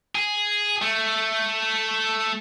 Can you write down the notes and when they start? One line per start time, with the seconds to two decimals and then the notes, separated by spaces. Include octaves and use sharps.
0.15 G#4
0.82 A3